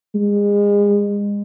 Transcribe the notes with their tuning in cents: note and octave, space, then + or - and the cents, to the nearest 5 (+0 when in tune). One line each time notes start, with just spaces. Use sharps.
G#3 -30